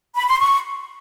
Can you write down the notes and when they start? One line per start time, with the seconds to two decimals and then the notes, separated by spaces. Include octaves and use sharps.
0.15 B5
0.27 C6
0.39 C#6